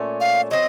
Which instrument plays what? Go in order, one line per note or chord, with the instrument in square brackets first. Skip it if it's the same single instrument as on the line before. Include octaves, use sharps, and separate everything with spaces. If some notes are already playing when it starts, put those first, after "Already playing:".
Already playing: [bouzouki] A#2 A3 C#4
[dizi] F5
[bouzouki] F#3 C4 [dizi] D#5